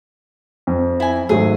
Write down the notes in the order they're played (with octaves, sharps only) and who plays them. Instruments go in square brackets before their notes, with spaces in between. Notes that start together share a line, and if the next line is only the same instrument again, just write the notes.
[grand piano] F2
[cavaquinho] E4 G#5
[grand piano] G#1 F#3 A3 [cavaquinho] G#4